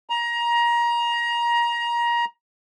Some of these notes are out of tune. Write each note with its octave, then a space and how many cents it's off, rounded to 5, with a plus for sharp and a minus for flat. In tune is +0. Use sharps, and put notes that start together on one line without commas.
A#5 +25